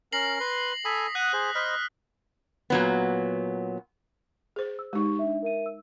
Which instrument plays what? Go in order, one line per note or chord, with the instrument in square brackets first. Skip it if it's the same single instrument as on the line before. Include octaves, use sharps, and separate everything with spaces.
[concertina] C#4 A#4 [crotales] A#6 C7 F#7
[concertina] B4 C6
[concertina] A4 G#5 B5 [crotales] D#6 B6
[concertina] F#5 D#6 [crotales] F#6
[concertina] G#4 C5
[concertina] C5 D#5 B5 [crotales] F6 B6
[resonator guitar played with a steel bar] A#2 F#3 B3
[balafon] G#4 C5
[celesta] E6
[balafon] G#3 D#4 [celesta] G4 C#6
[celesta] D4 E5
A#4 E5 D#7
E6